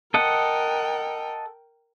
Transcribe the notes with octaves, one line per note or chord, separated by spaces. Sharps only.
A4 A#4 D#5 F#5 G5